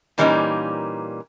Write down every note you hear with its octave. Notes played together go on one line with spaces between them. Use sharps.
A#2 E3 G3 A#3 C#4 D#4